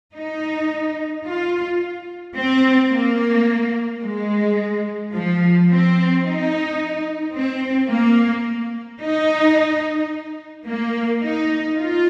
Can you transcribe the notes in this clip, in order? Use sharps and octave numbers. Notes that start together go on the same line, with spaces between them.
D#4
F4
C4
A#3
G#3
F3
C4
D#4
C4
A#3
D#4
A#3
D#4
F4